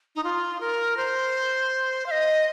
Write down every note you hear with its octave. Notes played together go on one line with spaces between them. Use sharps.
D#4
F4
A#4
C5
F5
D#5